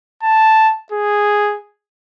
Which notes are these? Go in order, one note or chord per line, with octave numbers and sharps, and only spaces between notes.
A5
G#4